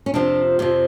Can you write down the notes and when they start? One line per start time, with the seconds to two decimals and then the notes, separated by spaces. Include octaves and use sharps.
0.06 C#4
0.14 F2 C3 F3 D4
0.59 F2 C3 F3